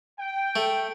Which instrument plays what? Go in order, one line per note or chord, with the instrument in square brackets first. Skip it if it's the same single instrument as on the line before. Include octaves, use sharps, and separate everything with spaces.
[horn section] G5
[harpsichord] A3